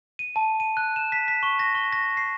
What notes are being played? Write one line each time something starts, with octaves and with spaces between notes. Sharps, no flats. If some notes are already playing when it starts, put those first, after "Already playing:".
D#7
A5
D#7
F#6
E7
B6
B6
C#6
A#6
C#6
A#6
C7